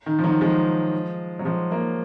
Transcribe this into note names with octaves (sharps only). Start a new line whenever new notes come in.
D#3
F3
D#3 F#3
F3 G#3
F#3
F3 G#3
F#3 A#3